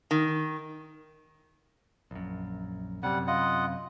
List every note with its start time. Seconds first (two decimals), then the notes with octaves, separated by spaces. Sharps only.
0.11 D#3
2.11 A#1 F#2
3.03 F#2 C3 G3 F#5
3.27 F4 D#5 F#5